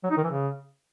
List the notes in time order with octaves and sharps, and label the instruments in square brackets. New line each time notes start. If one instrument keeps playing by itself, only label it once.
[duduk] F#3
D#4
D#3
E3
C#3